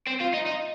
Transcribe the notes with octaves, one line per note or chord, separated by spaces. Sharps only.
C4
F4
D#4
D#4